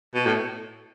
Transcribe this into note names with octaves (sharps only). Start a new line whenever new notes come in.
B2
A2